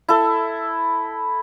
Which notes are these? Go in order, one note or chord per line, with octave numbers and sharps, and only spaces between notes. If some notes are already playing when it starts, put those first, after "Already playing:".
E4 A4